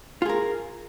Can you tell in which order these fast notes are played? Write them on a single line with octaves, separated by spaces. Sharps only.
F4 G#4 A#4